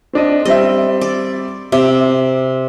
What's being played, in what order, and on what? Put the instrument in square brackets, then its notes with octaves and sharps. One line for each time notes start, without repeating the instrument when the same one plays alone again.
[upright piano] C4 D4 D#5
[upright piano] G3 C4 E5 [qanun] D#5
[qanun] D5
[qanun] C3 [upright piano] E5 D6